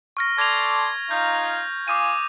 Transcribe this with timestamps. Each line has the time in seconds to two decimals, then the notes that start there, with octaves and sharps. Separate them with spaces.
0.17 C#6 F6 A#6
0.38 A4 D5 C6 G#6 F7
1.11 D#4 F4 G6
1.88 F4 G#5 D6 D#6 D#7